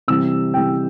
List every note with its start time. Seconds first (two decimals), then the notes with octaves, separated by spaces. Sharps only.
0.08 C3 E3 G3 E6
0.54 C3 E3 G3 G5